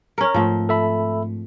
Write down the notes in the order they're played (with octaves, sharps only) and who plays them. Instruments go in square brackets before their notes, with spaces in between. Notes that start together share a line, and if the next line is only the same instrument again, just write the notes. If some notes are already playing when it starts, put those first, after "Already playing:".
[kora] C#4 A#4
[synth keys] G#2 A3 [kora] F3 C4
[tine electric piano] A4 E5 B5